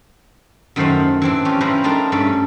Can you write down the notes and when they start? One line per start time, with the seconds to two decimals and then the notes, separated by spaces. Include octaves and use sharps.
0.76 F#2 D#3 A3 C5 F5 F#5
1.22 E3 C4 D4
1.45 C#4 F4 G4
1.60 F3 C#4 E4 B4 C5 A#5
1.84 A3 D4 D#4 F4 A#4
2.12 G2 A3 C#4 D5 E5